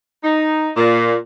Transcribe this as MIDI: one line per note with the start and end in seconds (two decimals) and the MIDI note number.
0.24 0.71 63
0.77 1.16 46